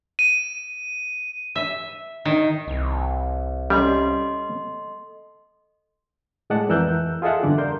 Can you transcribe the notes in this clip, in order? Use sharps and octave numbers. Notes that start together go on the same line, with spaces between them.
D#7
E5
D#3
C2
G3 C#4 A4 D#5 C6
A2 G#3 D5 F#5 A5
F2 E3 A#4 E6 F#6 G6
F4 G#4 A4 D#5 E5 F#5
E2 G2 D3 D5
A#4 C6 G6